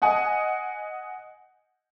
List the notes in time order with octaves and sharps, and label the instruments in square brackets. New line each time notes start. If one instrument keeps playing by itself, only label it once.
[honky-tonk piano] D#5 F#5 G#5 D#6